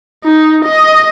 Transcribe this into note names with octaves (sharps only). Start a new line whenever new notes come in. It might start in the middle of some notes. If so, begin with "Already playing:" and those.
D#4
D#5